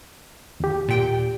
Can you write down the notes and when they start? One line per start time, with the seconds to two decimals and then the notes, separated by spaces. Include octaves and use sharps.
0.60 D#2 G4
0.89 A#2 G5